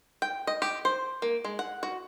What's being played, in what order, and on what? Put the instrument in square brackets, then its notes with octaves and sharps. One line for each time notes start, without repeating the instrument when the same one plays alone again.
[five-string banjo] G5
D#5
G4
C5
A#3
G#3
F#5
F#4